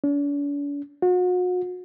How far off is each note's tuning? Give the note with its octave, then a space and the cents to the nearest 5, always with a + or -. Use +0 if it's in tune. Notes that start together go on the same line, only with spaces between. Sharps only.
D4 -45
F#4 -40